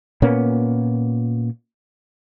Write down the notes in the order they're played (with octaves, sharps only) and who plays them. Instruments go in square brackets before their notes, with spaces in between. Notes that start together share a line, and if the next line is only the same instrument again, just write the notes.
[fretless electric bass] A#2 A#3 B3 C#4